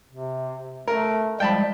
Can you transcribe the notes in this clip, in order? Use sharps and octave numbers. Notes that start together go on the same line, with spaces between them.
C3
A3 A#4
F3 G3 G#3 G5 A5 B5